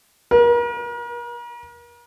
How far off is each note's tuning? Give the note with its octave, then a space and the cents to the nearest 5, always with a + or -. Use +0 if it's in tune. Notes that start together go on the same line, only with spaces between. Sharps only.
A#4 +40